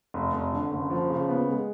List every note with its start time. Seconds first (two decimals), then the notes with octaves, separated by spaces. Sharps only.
0.14 F1
0.33 F1
0.53 D3
0.71 F#1
0.90 F3
1.10 C#3
1.29 B3
1.48 G#3